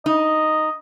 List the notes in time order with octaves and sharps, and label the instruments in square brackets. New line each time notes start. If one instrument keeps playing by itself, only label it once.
[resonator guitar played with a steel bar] D#4 [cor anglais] D#5